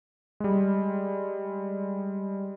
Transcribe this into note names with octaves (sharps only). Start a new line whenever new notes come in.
G3 G#3